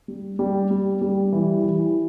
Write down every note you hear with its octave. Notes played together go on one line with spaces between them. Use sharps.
G3
G3
G3
G3
E3
E3